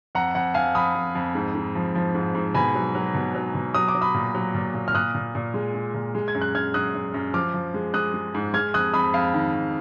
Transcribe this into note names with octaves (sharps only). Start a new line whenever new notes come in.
F2 F#5 A#5
F2 F#5
F2 F5 G#5
F2 B5 D#6
F2
F2
G#2
G#2
F3
F3
G#2
G#2
B2 G#5 B5
F#3
F#3
B2
F#3
B2
F#3 D#6
D6
F#3
B5 D#6
A#2
F#3
A#2
A#2
F6
A#2 D#6 F#6
A#2
A#2
G#3
G#3
A#2
G#3
G#6
F#2
F#6
F#2 F6 G#6
F#2 D#6 F#6
F#2
F#2
F3 D6 F6
F3
G#3
G#3 D#6 F#6
G#3
G#2
G#3 F6 G#6
F2 D#6 F#6
F2 B5 D#6
F2 F5
D#3
F2